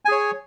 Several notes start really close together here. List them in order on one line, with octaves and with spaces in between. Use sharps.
G#5 G#4 C#5